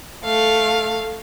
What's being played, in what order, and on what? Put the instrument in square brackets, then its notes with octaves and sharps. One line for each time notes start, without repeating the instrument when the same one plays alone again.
[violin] A3 F5